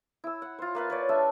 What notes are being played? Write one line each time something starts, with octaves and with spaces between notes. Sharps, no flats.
E4 E6
F#5
F4 C5
A#3 B4 F5
B4 C#5 D5
A3 D4 E5